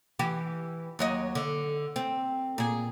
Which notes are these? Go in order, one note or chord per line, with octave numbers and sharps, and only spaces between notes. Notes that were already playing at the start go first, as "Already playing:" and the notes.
E3 G4
D#2 F#3 D#5
D3
C4
A#2 G#4